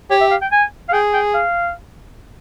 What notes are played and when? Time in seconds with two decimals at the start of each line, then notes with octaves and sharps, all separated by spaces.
0.10 G4 C#5
0.20 E5
0.31 F5
0.41 G5
0.52 G#5
0.89 F5
0.93 G#4 G5
1.14 G5
1.34 F5